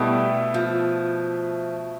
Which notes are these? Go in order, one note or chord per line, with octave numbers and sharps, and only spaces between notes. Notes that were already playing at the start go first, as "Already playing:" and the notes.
Already playing: B2 G3 A3 E4
F3